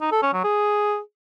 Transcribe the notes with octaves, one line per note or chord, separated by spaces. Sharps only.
D#4
A4
C#4
F#3
G#4